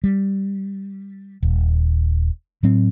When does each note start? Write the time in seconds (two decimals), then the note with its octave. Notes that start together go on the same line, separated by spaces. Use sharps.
0.04 G3
1.43 D#1
2.63 A2 F#3 C4